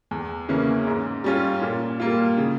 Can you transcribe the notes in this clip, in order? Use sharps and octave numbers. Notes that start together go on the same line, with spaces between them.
E2
C#3 E3 A#3 C#4
G#2
G3 C#4 F4
A#2
G3 A#3 F4
C#3